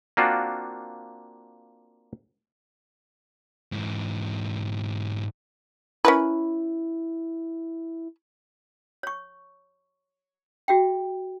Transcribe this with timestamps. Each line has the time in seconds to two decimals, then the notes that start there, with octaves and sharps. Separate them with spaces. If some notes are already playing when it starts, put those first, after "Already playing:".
0.17 A#3 C4 D4 F4 F#4
3.72 G#2 E3
6.05 C#4 E4 A#4 B4
9.03 C#5 C#6
10.68 F#4 G#4 E5 G5